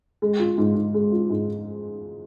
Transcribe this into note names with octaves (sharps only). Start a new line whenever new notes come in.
G#3
F4
G#2
G#2
G#3
F4
G#2